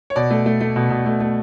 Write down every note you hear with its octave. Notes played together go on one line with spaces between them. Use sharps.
C#5
B2 D5
A3
A3
A3
B2
B2
A3
A3